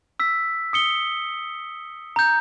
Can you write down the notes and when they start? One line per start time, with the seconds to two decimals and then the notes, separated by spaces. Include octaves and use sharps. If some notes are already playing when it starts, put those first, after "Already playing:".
0.20 E6 B6
0.73 D#6 C#7 G7
2.16 A#5 G6